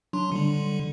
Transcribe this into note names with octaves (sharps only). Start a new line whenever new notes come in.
F#3 D4 C6
D3 G3